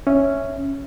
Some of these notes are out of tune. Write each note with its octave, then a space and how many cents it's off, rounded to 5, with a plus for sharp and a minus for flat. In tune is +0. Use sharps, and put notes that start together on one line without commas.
C#4 +0 E5 +0